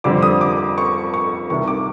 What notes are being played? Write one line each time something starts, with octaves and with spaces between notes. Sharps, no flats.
F2 D3 G3 C4 D6
D#6
D6
C#6
C#6
C2 C3 D#3 C#6
D6